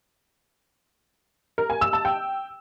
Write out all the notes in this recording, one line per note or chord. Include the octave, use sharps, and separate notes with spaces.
A#4
G#5
E6
A5
G5